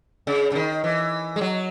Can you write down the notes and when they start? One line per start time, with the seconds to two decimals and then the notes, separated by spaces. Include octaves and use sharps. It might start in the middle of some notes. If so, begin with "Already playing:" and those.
0.27 C#3
0.52 C#3
0.55 D#3
0.84 E3
1.36 G#3
1.41 F#3